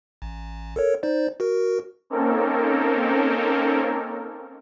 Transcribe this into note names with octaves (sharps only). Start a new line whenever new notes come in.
A1
A4 A#4 C#5
D#4 C5 D5
F#4 A#4
A#3 C4 C#4 D#4 A4 A#4